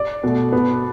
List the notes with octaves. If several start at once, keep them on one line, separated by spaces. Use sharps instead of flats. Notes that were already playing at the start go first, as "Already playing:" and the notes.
Already playing: D5
B2 A3
B2 B3